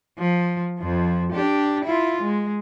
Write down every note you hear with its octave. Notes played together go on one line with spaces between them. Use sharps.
F3
F2 F3
D4 G4
E4 F4
G#3